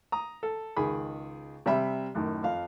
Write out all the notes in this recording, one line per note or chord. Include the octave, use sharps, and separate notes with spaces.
A#5 D#6
A4
C#2 D#3 G#4 B5
C3 G3 E5 B5
F#2 A2 D#3
F2 F5